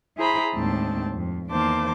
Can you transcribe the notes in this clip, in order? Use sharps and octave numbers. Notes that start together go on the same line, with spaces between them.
E4 G#4 C5 A#5 B5
D#2 A2 G#3 C4 D4 A5
F2
E2 D#3 A#3 C5 A5 D6